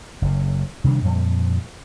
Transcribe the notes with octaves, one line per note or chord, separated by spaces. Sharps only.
F#1 C#3
C3 D#3 G3 D4
F2 A#2 F3 G3